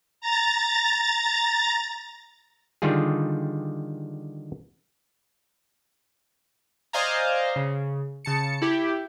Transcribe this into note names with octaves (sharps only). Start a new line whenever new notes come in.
A#5 A6
D3 D#3 G3 F4 G#4
C5 D5 D#5 F5 G#5 A#5
C#3
C#3 A5 C#7
E4 G4